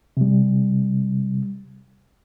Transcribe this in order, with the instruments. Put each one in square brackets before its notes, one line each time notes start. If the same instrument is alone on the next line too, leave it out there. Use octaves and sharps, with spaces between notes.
[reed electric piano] C3 G3